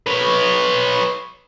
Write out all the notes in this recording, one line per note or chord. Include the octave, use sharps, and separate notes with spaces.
B4 C#5